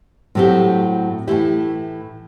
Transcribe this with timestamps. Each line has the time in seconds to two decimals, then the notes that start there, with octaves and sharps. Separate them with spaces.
0.35 A2 F#3 A3 C4 G4
1.27 A2 E3 A3 E4 G4